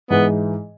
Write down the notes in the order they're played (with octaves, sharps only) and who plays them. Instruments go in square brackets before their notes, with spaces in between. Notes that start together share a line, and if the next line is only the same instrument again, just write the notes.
[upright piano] G#2 E3 G#3 [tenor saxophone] B3